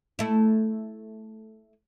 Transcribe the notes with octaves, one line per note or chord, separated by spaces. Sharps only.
A3 E4